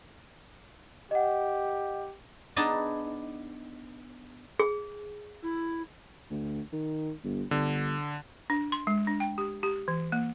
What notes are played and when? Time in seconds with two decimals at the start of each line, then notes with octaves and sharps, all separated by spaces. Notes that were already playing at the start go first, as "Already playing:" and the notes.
1.11 G4 D#5 F#5
2.56 B3 D4 D#4 G#4 A5
4.60 G#4
5.42 E4
6.31 D2
6.73 D#3
7.24 G1
7.51 G1 D3
8.50 D4
8.72 C6
8.87 G#3
9.07 D4
9.20 G5
9.38 G4
9.63 G4
9.88 E3
10.12 A#3